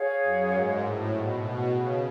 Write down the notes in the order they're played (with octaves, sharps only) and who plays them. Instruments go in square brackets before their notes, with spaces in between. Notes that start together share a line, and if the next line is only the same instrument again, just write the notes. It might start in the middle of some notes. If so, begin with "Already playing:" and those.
Already playing: [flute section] G#4 C#5 F5
[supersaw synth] F#2
G#2
A2
B2
B2
C#3